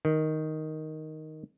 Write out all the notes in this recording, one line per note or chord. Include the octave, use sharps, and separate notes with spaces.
D#3